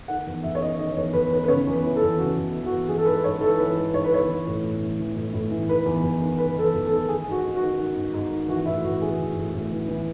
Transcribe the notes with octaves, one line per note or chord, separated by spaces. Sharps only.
D#3 F#5
E2
E2 E5
C#5
D#3 D#5
D#3 D#5
E2 C#5
E2 B4
D#3 B4
B4
C#3 C#5
E2
B4
E3
A4
E2
C#3 F#4
E2
E3
F#4
E2
E3 G#4
A4
G#2 B4
G#2 C#5
E3 A4
E3 B4
G#2
G#2 C#5
B4
E3 C#5
E3
A2
A2
E3
E3
A2
A2
E3
D#3 B4
E2
E2
D#3
D#3 B4
E2 A4
B4
E2
A4
D#3
D#3 G#4
G#2 F#4
G#2
F#4
D#3
D#3
G#2
G#2
D#3
E3 F#4
A2 E4
A2 F#4
E3 G#4
E3
A2
A2
E3
E3